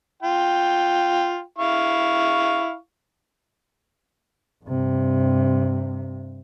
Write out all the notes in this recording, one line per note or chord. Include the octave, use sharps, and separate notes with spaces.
F4 G5
E4 F5 C#6
G2 C3